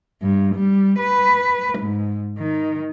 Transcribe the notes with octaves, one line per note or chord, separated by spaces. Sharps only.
G2
G3
B4
G#2
D#3